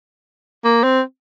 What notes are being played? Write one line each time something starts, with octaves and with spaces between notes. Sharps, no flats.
A#3
C4